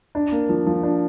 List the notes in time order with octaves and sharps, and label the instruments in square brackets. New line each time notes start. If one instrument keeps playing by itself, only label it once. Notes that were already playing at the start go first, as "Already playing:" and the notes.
[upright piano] D4
A#3
F3
F3
D4